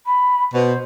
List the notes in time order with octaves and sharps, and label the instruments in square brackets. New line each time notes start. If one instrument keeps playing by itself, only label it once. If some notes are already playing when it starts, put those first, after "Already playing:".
[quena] B5
[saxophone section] B2 [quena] C5